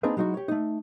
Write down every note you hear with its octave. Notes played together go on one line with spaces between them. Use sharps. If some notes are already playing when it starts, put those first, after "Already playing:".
A#3 C4 D4 D#4 G#4 B4
F#3 G#3 D#4 E4 F#4
G4 C#5
A3 D#4